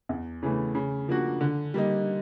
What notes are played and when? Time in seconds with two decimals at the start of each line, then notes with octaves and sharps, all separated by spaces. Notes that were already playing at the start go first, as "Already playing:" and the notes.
0.09 E2
0.43 C#3 E3 A3
0.75 C#3
1.08 F3 A#3 D4 F#4
1.41 D3
1.74 G3 A#3 D#4